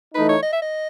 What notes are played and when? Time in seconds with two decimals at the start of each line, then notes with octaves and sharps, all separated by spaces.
0.14 E3 A3 D#4 B4
0.29 C#5
0.43 D#5
0.53 E5
0.62 D#5